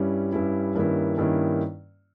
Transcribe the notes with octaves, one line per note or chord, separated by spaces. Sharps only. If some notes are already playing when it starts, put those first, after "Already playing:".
Already playing: G2 G3 C#4 E4
G2 G3 C#4 E4
G2 D#3 A#3 C#4 E4
G2 D#3 A#3 C#4 E4